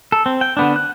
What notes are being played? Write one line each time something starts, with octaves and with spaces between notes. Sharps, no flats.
A4
C4
G5
D3 B3 D4
F#6